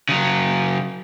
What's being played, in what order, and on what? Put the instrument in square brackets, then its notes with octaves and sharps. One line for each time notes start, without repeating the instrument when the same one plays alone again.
[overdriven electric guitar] C#3 F#3